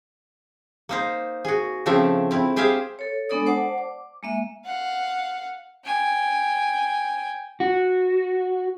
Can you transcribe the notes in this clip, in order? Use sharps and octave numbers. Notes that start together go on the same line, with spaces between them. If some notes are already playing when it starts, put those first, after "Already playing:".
A#3 D#4 C5
F#4 G#4
C#3 F3 A3 C4 D4 E5
C4 E4
G4 G#4 C5 E5 F5
A4 C#5
G#3 B3 D4 A4 D5 D#6
C5 D5 F#5 A5 D6
D6
G#3 A#3 E5
F5 F#5
G5 G#5
F#4